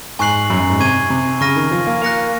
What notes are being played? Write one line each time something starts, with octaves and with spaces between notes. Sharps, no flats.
G#2 G#5 C#6 F#6 C7 F#7
F#2
F#2
G#2
C3 C#6 G#6 D#7
C3
C#3 C#6 F6 A#6 D#7
D#3
F3
A#3
A#3 F#6 A#6 C#7 F7